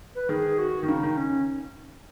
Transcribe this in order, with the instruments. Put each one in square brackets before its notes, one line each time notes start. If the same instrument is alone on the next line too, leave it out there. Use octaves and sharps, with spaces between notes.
[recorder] B4
[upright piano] D#3 [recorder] G#4
[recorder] F#4
[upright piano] D#3
[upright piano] C#3 [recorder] D#4
[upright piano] D#3
[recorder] C#4